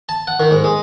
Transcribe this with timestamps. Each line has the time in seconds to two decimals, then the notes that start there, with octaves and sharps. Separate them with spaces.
0.09 A5
0.27 F#5
0.40 D#3
0.51 G#2
0.64 G#3